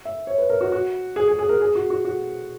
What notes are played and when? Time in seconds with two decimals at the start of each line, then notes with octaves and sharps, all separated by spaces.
0.05 E5
0.27 C#5
0.38 B4
0.50 A#4
0.61 F#4
0.72 F#4
1.16 G#4
1.28 G#4
1.39 G#4
1.49 A#4
1.61 G#4
1.75 F#4
1.90 F#4
2.05 F#4